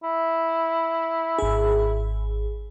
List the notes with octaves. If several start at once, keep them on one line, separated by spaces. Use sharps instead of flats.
E4
G#1 G#4